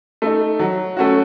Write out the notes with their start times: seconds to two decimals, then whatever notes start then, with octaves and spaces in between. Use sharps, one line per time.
0.22 A3 D#4
0.59 F#3
0.97 A3 C#4 F#4